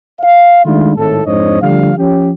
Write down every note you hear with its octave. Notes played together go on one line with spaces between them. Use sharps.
F5
D#3 G#3 A3 D4 E4 F4
G#1 A2 A4
F2 G#2 D4 C5 C#5 D#5
D3 F3 G3 A3 F5
F3 C#4 G4